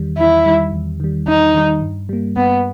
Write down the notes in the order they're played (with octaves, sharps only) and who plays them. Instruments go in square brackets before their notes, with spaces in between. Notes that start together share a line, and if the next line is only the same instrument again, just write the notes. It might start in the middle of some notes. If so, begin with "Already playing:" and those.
Already playing: [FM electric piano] E2 D#3 G3
[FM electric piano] E2 [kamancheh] E4
[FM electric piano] D#3 G3
E2
D#3 G3
[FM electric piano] E2 [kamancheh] D#4
[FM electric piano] D#3 G3
G2
G3 A#3
[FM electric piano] G2 [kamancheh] B3